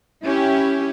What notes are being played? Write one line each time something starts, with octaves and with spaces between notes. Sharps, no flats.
C#4 E4 G4